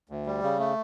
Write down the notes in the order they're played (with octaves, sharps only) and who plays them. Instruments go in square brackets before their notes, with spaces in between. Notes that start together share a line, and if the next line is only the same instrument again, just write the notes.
[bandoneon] D2
G3
C#3
A3